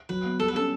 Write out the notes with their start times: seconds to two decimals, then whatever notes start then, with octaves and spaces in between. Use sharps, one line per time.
0.09 F#3 B4
0.25 B3
0.40 G3 A4
0.48 B4
0.55 C#4 A4